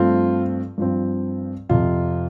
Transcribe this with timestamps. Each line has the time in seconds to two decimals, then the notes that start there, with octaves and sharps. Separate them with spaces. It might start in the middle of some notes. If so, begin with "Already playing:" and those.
Already playing: G2 F3 A3 C4 F4
0.78 G2 F3 C4
1.69 F2 C3 F3 F4